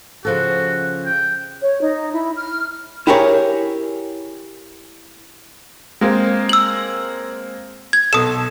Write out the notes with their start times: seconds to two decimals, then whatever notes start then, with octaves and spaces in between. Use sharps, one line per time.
0.25 C#3 F3 F#4 A4
1.05 G5
1.62 C#5
1.81 D#4
2.13 E4
2.36 F6
3.07 E4 G4 G#4 A#4 C#5
6.01 G#3 A#3 C4
6.49 E6 F#7
7.93 G#6
8.13 B1 A4 D#6 E7